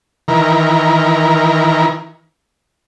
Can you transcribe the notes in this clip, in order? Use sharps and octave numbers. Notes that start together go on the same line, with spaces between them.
D#3 E3 A#4